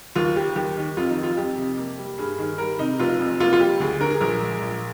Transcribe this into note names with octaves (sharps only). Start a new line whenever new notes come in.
D#2 F4
G3 G4
D#2 G4
D#3
F2 F4
D#4
D#3
F4
F2 G4
C3
A#3
G3
G2 G#4
D#3 G#4
G3 A#4
C3 D#4
F1 F4
F2
A#3 F4
F4
G3 G4
D2 G#4
D3 A#4
G#4
A#1 A#4
G#3
A#1